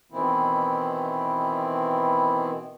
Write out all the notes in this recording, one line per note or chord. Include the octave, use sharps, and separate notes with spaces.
B2 D#3 E3 B3 C4 E4